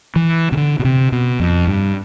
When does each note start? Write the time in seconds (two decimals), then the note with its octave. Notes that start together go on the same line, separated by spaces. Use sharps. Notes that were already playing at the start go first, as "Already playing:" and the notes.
0.16 E3
0.52 C3
0.57 D3
0.79 B2
0.85 C3
1.12 B2
1.40 F2
1.67 G2